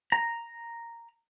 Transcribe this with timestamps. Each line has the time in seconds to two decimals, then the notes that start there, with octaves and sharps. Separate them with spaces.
0.12 A#5